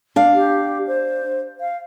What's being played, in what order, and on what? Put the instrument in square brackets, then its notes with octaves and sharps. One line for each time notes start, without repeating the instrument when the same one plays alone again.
[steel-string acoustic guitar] D4 F5
[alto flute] G4
C5
F5